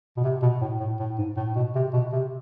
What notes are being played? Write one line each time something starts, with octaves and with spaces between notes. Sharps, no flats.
B2
C3
B2
A2
A2
A2
G#2
A2
B2
C3
B2
C3